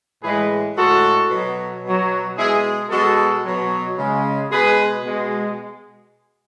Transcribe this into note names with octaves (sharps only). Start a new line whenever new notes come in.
A2 E3 G#3 G#4 B4
A2 G#3 F#4 A4
B2 F#3
B2 F#3
B2 G#3 E4 G#4
B2 G#3 F#4 A4
B2 F#3
C#3 G#3
B2 G#3 G#4 B4
B2 G#3